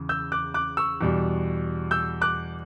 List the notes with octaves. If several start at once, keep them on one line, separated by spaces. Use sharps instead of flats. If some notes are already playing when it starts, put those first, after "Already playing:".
Already playing: E2 C#3
E6 G6
D6 F#6
D6 F#6
C#6 E6
E2 B2 G3
E6 G6
D6 F#6